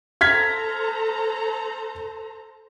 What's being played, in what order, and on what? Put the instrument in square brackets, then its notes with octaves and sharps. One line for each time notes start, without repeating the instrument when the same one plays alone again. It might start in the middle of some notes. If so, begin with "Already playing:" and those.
[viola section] A4 C5 A#5 [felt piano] F6 G#6 B6